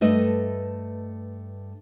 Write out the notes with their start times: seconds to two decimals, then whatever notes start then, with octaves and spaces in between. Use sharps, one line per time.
0.01 G2 A3 B4 D#5